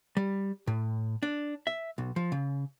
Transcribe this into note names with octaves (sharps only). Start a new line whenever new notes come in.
G3
A2
D4
E5
B1
F3
C#3